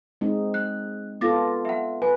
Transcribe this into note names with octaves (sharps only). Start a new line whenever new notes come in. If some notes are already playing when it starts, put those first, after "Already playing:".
G#3 C4 D#4
F#6
B3 F4 A4 D6 A6 A#6
E5 F#5
B4 G#5